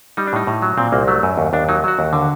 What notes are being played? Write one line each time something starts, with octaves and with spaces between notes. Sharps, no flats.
G3 D#4
D4
A2 D#4
A2
F#3
A#2 C4
C2 A#3
F#3 A3
F#2
D#2
D#2 D4
F#3 D#4
F#3 F#4
D#2
D3